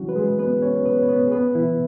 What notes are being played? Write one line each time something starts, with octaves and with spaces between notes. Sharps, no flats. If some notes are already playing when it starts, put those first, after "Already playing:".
Already playing: E3 F#3 C#4 E4 F#4
B4
G#3 G#4
B3 B4
C#4 C#5
B3 B4
C#5
B3 B4
G#4
B3 B4
E3 E4